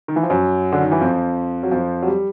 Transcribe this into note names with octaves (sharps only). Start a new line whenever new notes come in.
D#3
E3
F3
F#2 F#3
D3
D#3
E3
F2 F3
F#3
F2 F3
F#3
G3